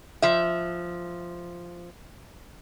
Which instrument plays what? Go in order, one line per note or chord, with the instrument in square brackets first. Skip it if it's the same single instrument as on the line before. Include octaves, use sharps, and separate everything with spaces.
[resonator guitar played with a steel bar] F3 E5